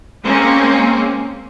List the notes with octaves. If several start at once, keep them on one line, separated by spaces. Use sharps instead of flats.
G#3 A#3 C4 C#4